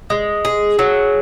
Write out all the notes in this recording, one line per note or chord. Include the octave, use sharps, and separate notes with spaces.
G#3
G#4
F#3